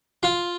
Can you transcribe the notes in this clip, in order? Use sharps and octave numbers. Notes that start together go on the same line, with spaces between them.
F4